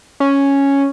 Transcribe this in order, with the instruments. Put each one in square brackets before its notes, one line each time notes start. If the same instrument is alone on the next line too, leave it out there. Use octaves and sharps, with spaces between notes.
[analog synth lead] C#4